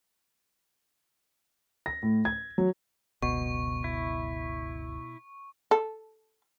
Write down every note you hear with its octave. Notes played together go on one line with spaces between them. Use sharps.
A#6
A2
G#6
F#3
F#1 C#2 B2 C#6
E4
A4